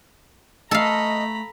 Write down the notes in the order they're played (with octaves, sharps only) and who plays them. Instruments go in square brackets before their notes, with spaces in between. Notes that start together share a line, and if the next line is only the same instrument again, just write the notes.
[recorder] A3 [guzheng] A4 F5 [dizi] D#5 [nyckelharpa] A#5 B5